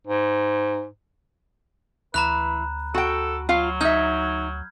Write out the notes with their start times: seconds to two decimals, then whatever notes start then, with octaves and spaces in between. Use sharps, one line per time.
0.07 G#2
2.14 D2 E3 B4 A#5 B5 F#6
2.94 F#4 A4 G5
3.49 F#3 F4 F5
3.81 D#4 E5 F6 G6 G#6